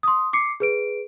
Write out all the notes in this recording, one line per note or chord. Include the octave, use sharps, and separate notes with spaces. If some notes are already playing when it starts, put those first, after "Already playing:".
C6 D#6
D6 C7 C#7
G#4 B4 D7